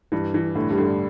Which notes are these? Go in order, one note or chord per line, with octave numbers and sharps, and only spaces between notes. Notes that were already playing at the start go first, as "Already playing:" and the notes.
G2 E3
E3
A2 D3
G2 G3
D3
G3